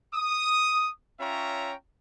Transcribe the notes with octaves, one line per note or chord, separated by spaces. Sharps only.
D#6
C#4 F4 C#5 E5 G5 A#5